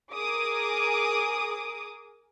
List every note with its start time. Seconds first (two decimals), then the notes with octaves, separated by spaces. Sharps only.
0.15 G#4 A#4 D6 D#6